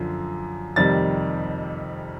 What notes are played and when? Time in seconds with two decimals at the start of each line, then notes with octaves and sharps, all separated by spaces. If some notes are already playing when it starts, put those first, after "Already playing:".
Already playing: F#2 D3 F3
0.76 F2 C3 D#3 G3 A6